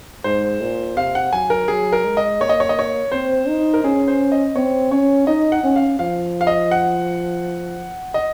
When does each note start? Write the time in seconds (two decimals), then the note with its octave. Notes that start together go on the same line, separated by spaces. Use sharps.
0.24 G#2 C5
0.61 A#2
0.97 C3 F5
1.15 F#5
1.33 F#3 G#5
1.50 A#4
1.68 F#3 G#4
1.92 A#4
2.05 G#3
2.17 D#5
2.40 A#3 C#5
2.49 D#5
2.60 C#5
2.69 D#5
2.79 C#5
3.12 C4 C5
3.48 D#4
3.74 A#4
3.84 C#4 G#4
4.08 C5
4.32 D#5
4.56 C4 C#5
4.91 C#4 C#5
5.27 D#4 D#5
5.52 F#5
5.63 C#4
5.76 F5
5.99 F3 F5
6.41 F5
6.47 D#5
6.71 F#5
8.14 D#5